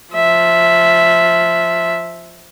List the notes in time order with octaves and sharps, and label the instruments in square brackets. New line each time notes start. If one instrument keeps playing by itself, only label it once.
[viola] F3 E5